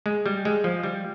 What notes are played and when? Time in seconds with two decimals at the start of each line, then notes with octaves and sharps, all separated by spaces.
0.06 G#3
0.26 G3
0.45 G#3
0.64 F3
0.83 G3